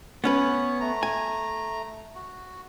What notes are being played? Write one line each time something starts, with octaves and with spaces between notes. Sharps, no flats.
B3 C#4 B4 C#5
A3 A#5
G#5
F#4